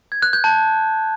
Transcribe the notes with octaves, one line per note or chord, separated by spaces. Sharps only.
G#6
F#6
G6
A5